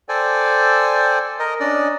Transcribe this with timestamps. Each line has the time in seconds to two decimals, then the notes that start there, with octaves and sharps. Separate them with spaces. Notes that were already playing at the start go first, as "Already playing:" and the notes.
0.09 A4 C5 D5 G5 G#5
1.39 A#4 D#5
1.60 C#4 D4 D5 D#5